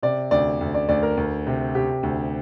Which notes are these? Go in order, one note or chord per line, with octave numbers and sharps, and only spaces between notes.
C3 D5
D2 D5
D2
D5
D2 D5
A#4
D2
C3
C3 G4
D2